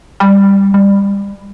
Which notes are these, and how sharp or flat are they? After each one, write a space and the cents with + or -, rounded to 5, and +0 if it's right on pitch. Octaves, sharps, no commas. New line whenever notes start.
G3 +10
G3 +25